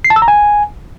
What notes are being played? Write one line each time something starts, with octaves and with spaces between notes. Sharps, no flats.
C7
A5
E6
A#5
G#5